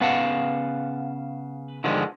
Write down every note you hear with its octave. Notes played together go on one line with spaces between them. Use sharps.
C#3 B3 B4 F5 F#5 A5
D3 D#3 F3 G3 G#3 B3